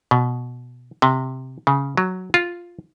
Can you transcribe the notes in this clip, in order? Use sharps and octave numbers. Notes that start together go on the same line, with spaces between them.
B2
C3
C#3
F#3
F4